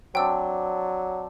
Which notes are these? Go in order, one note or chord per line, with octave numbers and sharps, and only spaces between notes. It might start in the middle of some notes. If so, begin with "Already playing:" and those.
F#3 C4 D4 G5 E6